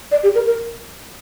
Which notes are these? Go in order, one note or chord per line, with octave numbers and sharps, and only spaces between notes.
D5
G4
A#4
A#4